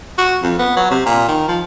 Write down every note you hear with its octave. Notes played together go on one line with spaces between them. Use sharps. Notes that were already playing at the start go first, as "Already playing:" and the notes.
F#4
F2
B3
F#3
C3
A#2
D#3
F3